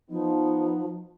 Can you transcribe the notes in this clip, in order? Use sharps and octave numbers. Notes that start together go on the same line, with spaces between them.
F3 B3 D#4